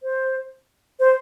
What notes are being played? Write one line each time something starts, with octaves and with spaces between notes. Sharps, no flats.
C5
C5